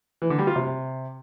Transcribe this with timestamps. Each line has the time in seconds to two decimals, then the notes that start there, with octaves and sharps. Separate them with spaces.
0.22 E3
0.30 D3
0.39 G3
0.47 F4
0.56 C3